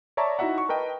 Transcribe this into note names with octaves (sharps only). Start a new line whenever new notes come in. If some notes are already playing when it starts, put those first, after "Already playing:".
C#5 D5 E5 A5 A#5 C#6
D#4 E4 F#4 D#5 E5 F#5
C#6
A#4 B4 D#5 G5 A5